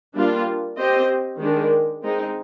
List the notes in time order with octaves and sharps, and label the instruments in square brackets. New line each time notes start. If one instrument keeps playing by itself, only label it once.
[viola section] G3 A#3 D4 F4
C4 G4 C5 D#5
D#3 G#3 D4
G#3 C4 D#4